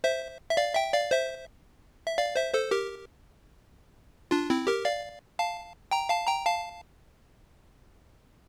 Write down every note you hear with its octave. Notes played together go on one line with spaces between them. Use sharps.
C5 E5
E5
D5 F5
E5 G5
D5 F5
C5 E5
E5
D5 F5
C5 E5
A4 C5
G4 A#4
D4 F4
C4 E4
G4 A#4
D5 F5
F5 A5
G5 A#5
F5 A5
G5 A#5
F5 A5